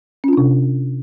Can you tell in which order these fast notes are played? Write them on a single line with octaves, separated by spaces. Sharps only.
C#4 F4 D4 C3